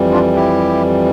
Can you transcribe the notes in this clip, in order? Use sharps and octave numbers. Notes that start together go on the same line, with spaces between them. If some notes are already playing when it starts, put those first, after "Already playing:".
Already playing: F2 E3 G3
D4 F4
E4 G4